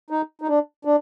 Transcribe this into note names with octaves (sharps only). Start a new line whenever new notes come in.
D#4
D#4
D4
D4